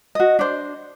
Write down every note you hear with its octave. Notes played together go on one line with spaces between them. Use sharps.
F#4 D#5
D4 C5